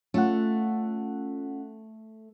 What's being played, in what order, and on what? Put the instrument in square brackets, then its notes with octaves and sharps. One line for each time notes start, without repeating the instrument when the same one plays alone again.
[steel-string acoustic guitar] A3 [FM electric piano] C#4 F4 F#5